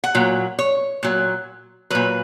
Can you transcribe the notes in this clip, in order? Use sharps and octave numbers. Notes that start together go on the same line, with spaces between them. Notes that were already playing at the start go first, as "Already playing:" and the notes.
F#5
A#2 F#3
C#5
A#2 F#3
A#2 F#3 B4